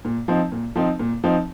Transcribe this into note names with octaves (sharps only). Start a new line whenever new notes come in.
A#2
F3 C4 D#4
A#2
F3 C4 D#4
A#2
F3 C4 D#4